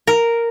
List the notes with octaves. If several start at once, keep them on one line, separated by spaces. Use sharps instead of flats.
A#4